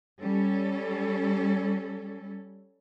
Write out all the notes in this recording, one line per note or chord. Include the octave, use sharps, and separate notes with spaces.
G3 C#4 A4